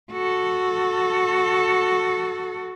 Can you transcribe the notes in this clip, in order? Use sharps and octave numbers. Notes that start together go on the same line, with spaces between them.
F#4 A4